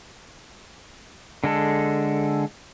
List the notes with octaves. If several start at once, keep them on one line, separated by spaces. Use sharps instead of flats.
D3 G#3 A4